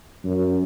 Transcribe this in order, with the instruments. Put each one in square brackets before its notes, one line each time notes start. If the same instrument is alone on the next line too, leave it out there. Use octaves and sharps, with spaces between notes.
[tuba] F#2